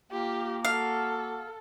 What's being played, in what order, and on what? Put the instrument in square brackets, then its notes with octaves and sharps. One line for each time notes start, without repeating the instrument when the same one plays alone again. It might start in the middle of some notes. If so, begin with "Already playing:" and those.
[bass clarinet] A#3 [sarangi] F4 [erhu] G4
[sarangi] F#4 [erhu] A4 [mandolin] F5